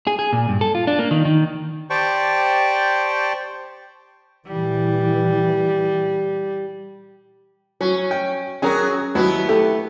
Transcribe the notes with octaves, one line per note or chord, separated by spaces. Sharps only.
G#4
G#4
A#2
G2
A4
F4
D4
A#3
D#3
D#3
G4 C5 D5 G5 A5 C#6
A#2 E3 G3
F#3 C#4
G5
F#3 C#4 G#4 A#4
D#2 F#3 B3 E4
A3 G4 A4